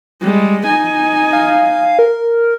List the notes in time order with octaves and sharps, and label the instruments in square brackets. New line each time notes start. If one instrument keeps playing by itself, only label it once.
[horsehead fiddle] G3 G#3
D#4 G#5
[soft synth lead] F5
A#4